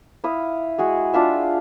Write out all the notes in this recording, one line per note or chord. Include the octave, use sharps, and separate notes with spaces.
E4 F5 D#6
G#3 F#4 G#4
D4 F4 E5